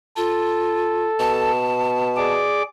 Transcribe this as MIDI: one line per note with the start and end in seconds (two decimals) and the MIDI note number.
0.17 1.08 65
0.17 1.51 69
1.20 2.45 47
1.20 2.33 81
2.17 2.62 68
2.17 2.62 74
2.17 2.62 86